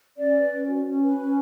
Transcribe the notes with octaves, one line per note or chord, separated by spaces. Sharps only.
C#4 D5
B4
C#4
F#4
C#4
B4
C#4